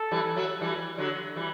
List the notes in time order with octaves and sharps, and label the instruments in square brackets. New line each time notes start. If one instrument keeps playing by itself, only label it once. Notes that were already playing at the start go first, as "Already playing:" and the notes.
Already playing: [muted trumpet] A4
[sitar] E3 G3
F#3 A3
E3 G3
D3 F#3
E3 G3